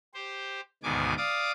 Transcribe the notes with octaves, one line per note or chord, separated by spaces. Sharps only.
G4 C5
D2 G#2 B2 D#3 G#5 D6
D5 F5 D6 D#6